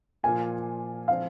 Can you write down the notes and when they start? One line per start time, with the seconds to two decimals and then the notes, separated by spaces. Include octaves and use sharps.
0.23 A#2 F3 A#3 F4 G#5
1.08 F3 C4 F4 F5